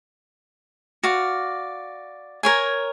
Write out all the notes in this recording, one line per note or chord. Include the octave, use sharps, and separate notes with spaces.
F#4 D5 F5
A#4 C#5 G#5